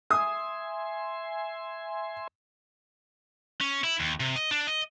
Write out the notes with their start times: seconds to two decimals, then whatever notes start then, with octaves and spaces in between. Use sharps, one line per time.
0.11 E5 G#5 C6 D#6
3.61 C#4
3.84 E4
4.00 D#2
4.20 C3
4.36 D#5
4.51 D4
4.67 D#5